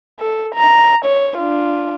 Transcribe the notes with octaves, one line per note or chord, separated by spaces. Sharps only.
A4
A#5
C#5
D4 F4